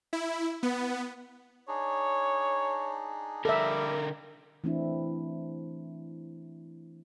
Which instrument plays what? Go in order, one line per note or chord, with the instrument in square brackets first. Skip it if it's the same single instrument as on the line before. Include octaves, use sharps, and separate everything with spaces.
[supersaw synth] E4
B3
[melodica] D4 D#4 G#4 [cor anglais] C#5
[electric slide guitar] D3 A#4 [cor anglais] G3 [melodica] A#3 A#5 [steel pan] A4 E5
[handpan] E3 A3 C4 D4 E4